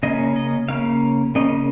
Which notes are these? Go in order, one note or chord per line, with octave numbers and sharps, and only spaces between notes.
C#3 A#3 C#4 D#5
D#5
C#3 A#3 C#4 F5
C#3 A#3 C#4 D#5